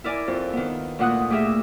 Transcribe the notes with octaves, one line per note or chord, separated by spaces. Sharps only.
E4 A#4 D5 G#5
F2
D#3 B3
D2 A#2 F#5 D#6 F#6
A3 G4 G#4 A#4 E5